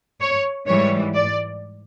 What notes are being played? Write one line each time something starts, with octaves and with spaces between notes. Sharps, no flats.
C#5
G#2 E3 G3 C#5
D5